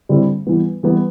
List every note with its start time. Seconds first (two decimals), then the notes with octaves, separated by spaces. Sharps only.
0.09 D3 G3 C4 E4
0.47 E3 G3 B3
0.83 E3 G3 B3